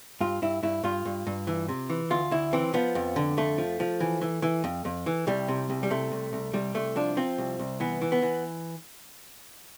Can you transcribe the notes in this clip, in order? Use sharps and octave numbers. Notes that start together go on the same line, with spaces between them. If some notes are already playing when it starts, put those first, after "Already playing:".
G2 F4
G2 E4
G2 E4
G2 F4
G2
G2
E3
C3
E3
D2 F4
D2 E4
E3 C4
F3 B3
F2
D3
F2 A3
F3
F3
E3
E3
E3
F2
F2
E3
C2 G3
C3
C2
G3
C3 A3
C2
C2
C2 G3
C2 A3
F3 D4
F3 C4
C2
C2
E3 B3
E3
B3
E3